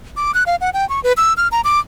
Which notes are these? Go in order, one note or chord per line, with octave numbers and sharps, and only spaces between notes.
D6
F#6
F5
F#5
G5
C#6
B4
E6
F6
A#5
D6